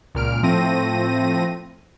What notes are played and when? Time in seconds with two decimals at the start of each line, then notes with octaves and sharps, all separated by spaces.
0.15 C#2 A#2 F6 D7
0.43 A2 F3 A3 C4 A#6 D#7